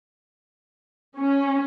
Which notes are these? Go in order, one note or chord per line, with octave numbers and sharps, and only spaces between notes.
C#4